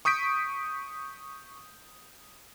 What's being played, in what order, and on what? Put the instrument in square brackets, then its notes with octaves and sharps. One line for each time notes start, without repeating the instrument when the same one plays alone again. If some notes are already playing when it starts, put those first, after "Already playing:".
[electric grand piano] C#6 D#6 G6 B6 D7